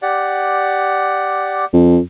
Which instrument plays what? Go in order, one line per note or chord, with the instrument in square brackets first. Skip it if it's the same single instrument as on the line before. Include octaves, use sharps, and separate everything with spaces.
[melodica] G4 D5 F#5
[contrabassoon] F2